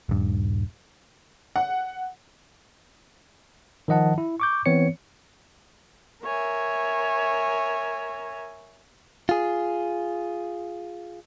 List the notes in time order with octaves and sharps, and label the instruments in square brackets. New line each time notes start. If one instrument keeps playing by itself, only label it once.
[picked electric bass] D#1 G2
[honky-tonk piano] F#5
[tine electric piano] D#3 F3 D#5 F#5 A5
E4
C#6 D6 G6
E3 B3 C4 C#5 C#7
[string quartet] A#4 C#5 E5 G#5
[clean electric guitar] F4 G#4